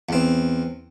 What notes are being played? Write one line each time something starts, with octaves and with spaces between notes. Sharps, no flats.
E2 C4